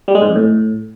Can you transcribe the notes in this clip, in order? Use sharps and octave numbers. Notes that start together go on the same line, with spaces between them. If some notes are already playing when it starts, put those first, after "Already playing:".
G3
G#3
G#2
F2
A2